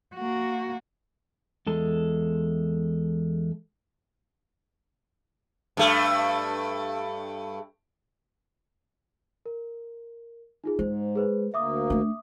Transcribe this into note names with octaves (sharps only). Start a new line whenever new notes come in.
A#3 F#4
E2 G#3 A4
G2 A3
A#4
D#4 F4 G#4
G#2 G#3 C5
G#4 B4 C5
D2 A#3 E5 D6 D#6
A3 D4